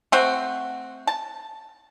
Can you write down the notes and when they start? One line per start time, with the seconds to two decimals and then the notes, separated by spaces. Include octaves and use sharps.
0.12 A3 C4 F#4
1.07 A5